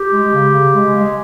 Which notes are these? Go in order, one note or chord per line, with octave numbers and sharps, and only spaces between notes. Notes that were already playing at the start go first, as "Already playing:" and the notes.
Already playing: G4
G#3
C#3
C#3
G#3
G#3